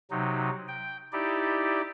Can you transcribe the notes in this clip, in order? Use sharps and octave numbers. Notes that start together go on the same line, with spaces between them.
C3 F#3 D#4
G5
D#4 E4 G4 D5